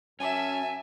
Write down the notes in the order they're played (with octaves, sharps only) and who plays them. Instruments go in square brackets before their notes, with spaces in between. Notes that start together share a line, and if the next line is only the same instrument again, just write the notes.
[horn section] F#2 A5 [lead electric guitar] C#4 [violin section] E5 [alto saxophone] G#5